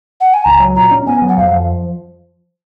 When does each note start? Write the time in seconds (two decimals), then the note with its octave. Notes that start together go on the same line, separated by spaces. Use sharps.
0.21 F#5
0.34 G#5
0.45 C#2 A#5
0.60 F#3
0.76 A#2 A#5
0.91 C#4
1.07 B3 G#5
1.22 F#3
1.29 F#5
1.37 F2 F5
1.53 F3